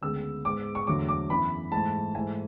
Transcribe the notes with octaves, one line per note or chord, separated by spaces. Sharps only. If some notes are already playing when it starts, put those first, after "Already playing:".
D2 C#3 G#3 B3 E6
G#2 G#3 B3 D6
C#6
E2 D3 F#3 A3 D6
D6
F#2 E3 B3 B5
G#2 E3 A3 A5
G#2 E3 A3 G#5